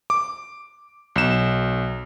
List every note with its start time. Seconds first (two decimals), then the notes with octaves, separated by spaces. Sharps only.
0.10 D6
1.16 B1 E7